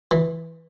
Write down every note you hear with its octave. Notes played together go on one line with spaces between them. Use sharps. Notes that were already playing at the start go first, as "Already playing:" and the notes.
E3